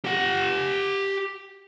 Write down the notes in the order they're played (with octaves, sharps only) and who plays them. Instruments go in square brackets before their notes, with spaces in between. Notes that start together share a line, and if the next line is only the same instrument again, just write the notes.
[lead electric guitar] G4 F#5